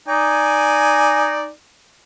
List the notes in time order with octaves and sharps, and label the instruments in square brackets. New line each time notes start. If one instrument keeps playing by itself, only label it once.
[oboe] D#4 [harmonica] D5 G#5